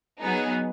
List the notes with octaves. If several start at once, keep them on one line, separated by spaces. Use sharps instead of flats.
F#3 B3 D#4 G#4